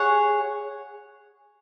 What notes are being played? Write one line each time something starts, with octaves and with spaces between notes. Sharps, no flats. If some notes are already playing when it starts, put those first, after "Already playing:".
Already playing: G#4 C#5 F#5